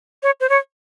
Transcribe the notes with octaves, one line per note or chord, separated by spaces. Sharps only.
C#5
C5
C#5